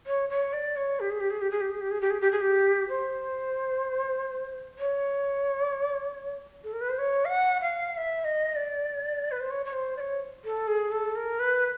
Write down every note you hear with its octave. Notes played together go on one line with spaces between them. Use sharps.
C#5
C#5
D5
C#5
G4
G#4
G4
G#4
G4
G#4
G4
G#4
G4
G#4
G4
G#4
G4
G#4
G4
C5
C#5
A4
A#4
B4
C5
C#5
F5
F#5
F5
F5
E5
D#5
D5
B4
C5
C#5
C#5
C5
D5
C#5
A4
G#4
A4
A#4
B4